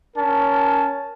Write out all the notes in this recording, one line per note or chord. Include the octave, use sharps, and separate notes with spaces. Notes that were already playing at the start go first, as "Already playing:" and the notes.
C#4 A#4 A5